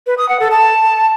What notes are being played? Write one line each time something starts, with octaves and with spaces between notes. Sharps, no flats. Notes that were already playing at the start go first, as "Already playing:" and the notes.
B4
D#6
F#5
A4
A5